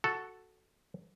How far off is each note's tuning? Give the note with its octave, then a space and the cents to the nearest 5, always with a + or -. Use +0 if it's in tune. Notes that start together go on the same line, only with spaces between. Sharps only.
F#4 +0 A4 +0